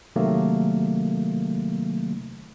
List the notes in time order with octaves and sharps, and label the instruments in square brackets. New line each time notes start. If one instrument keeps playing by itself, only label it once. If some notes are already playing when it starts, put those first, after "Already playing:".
[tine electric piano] C3 D#3 F#3 A3 A#3